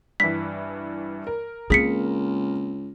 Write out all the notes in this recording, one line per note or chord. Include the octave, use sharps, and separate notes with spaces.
G2 E3 B6
A#4
C#2 A#3 C4 G#4 B6 C#7